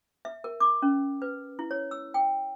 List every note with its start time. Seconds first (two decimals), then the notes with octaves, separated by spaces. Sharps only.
0.25 E5
0.44 A#4
0.60 D6
0.82 C#4
1.22 B4
1.59 E4
1.71 C#5
1.91 E6
2.14 G5